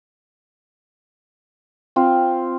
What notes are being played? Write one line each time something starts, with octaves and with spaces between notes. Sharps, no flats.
C4 F4